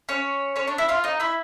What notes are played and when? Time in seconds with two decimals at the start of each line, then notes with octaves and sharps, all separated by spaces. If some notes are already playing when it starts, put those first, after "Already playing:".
0.09 C#4 C#5
0.56 C#4 C#5
0.67 D4 D5
0.78 E4 E5
0.88 F4 F5
1.04 D#4 D#5
1.20 E4 E5